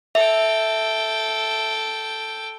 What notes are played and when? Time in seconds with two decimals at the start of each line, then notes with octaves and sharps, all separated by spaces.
0.15 A4 E5 G5